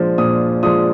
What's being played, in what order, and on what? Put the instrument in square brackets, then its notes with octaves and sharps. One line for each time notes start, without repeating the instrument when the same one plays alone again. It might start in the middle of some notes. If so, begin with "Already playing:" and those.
Already playing: [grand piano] A#2 F3 G#3 D4 F4
A#2 D#6
F3 G#3 D4 F4 D#6